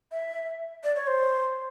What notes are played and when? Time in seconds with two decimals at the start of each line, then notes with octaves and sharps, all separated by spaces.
0.11 E5
0.84 D5
0.96 C#5
1.07 C5